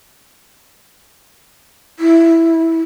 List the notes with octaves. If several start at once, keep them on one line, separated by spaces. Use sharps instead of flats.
E4